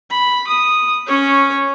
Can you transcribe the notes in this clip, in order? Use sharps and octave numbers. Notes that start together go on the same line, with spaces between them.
B5
D#6
C#4 C#5